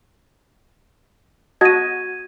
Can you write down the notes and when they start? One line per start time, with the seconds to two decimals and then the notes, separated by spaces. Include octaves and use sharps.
1.61 F#4 D#5 A5 G#6 D#7